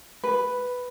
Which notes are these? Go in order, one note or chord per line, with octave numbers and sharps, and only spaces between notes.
B4